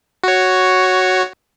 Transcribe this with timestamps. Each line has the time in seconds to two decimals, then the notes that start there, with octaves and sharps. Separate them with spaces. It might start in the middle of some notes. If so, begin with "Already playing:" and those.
0.24 F#4 C#5